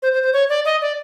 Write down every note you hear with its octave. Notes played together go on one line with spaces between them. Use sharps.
C5
C5
C5
C#5
D5
D#5
D5